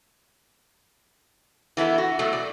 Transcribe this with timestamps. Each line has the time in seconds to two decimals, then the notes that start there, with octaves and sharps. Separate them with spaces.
1.77 E3 B3 E4 A4
1.98 F#4
2.19 B2 F#3 A3
2.33 D5